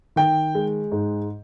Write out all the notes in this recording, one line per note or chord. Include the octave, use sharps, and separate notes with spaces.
D#3 G5
G#3
G#2